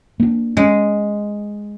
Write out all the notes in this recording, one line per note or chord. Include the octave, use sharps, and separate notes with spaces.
A#3 D4
G#3 C#4